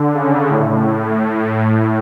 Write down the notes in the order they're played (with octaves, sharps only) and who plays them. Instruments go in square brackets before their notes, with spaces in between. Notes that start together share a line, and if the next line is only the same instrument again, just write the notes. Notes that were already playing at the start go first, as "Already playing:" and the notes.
Already playing: [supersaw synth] D3
C#3
A2